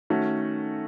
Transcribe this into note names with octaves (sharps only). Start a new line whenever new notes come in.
D#3 A3 C#4 F#4